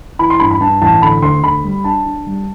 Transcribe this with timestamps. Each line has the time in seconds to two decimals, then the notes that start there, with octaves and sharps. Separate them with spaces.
0.19 E3 B5
0.30 C6
0.40 G2 B5
0.51 B5
0.61 G2 A5
0.82 A1 A5
1.02 D3 B5
1.22 D2 C6
1.43 D2 B5
1.64 G3
1.84 D4 A5
2.06 D4
2.27 G3